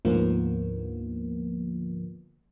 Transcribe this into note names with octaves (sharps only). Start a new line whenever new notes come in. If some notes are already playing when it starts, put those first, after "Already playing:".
D2 G#2 D3 F3 A#3 B3